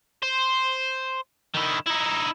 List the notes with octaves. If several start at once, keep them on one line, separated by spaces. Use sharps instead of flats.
C5
D#3 E4
D#4 E4